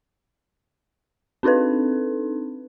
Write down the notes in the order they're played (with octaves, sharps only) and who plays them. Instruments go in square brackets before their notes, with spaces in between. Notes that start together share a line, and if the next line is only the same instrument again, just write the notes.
[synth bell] C4 D4 D#4 A4 B4